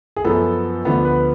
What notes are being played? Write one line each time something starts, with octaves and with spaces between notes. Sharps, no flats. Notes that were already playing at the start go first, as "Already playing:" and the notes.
G#4
F#2 F3 B3 A4
D2 D3 F3 B3
B4